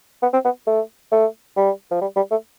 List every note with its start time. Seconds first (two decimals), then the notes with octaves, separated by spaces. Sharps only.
0.22 B3
0.33 C4
0.45 B3
0.67 A3
1.12 A3
1.57 G3
1.91 F3
2.01 G3
2.16 G3
2.31 A3